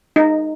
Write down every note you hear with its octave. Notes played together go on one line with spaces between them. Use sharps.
D#4